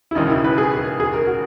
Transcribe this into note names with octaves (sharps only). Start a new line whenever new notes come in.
E4
E1 D#2 C#3 D#4
E4
B4
G#4
G#4
A#4
F#4